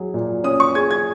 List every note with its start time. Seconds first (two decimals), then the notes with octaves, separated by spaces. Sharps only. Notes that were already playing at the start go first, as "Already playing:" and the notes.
Already playing: F#3 G#4
0.14 A#2
0.44 C#4 D#6
0.60 C#6
0.75 G#4 G#6
0.91 G#6